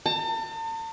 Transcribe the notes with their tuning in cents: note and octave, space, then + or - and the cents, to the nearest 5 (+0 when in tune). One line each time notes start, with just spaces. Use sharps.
A5 +40